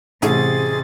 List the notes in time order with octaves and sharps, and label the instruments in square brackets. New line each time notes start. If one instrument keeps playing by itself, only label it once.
[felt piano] A1 [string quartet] C3 A6 [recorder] G#4